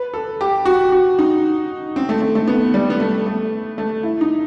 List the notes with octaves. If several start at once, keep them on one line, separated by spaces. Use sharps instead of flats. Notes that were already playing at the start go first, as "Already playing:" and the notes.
Already playing: B4
A4
G4
F#4
F#4
D#4
C4
A3
A3
A3
B3
G3
B3
A3
A3
A3
E4
D#4